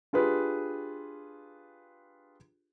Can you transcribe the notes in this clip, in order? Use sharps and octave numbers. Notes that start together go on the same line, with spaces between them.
D4 F4 G4 G#4 B4